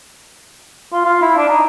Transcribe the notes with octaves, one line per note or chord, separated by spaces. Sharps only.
F4
F4
E4
D4
D#4